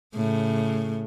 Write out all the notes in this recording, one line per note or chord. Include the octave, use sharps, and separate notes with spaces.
A2 C#3